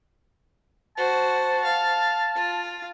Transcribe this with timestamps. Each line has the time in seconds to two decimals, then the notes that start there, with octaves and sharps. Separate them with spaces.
0.97 F#4 C5 A5
1.65 F5
2.35 F4